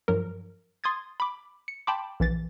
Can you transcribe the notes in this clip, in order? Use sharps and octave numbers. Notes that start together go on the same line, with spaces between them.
G2 F3 F#3 A#4
C6 D#6 G#6 A6
B5 D6
C#7
G5 A5 B5 C6 D6
A#1 E3 A6